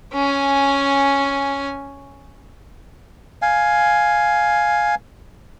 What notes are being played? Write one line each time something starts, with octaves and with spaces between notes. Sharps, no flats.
C#4 G#5
F5 G#5